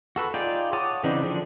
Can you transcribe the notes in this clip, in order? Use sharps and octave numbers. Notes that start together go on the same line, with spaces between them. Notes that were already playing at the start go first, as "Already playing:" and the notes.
F#4 A4 B4
D#4 F4 G#4 D5 G5
C#5 F#5 A5 D6 D#6
C#3 E3 C4 D4 D#4
D3 F3 D4